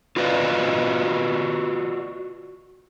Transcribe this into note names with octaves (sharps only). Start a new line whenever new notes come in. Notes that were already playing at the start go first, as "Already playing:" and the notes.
F4 F#4 B4 D5 D#5 F5